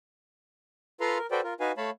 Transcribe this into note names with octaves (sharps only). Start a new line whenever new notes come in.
F4 A4 B4 F5 A#5 C6
A#4
F#4 A4 B4 C5 D5 G5
F4 A#4
D#4 F#4 B4 F5 G#5
A3 C#5 F5 A5 B5